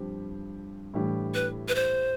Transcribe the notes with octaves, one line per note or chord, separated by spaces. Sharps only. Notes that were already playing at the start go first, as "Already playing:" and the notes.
Already playing: G2 F3 C4 G4
A2 E3 G3 D4 G4
B4
B4
C5